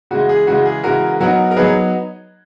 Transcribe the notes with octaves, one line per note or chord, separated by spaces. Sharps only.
C#3 E3 G#3 F#4
G#4
C#3 E3 G#3 F#4
G#4
C#3 E3 G#3 F#4 A#4
F#3 B3 D#4 F#4 A#4
A#4
F#3 B3 D#4 G#4 B4